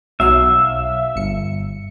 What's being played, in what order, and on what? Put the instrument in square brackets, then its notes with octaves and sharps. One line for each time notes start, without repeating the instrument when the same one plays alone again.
[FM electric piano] B1 F#3 F5 [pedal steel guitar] E5
[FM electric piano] G1 C#7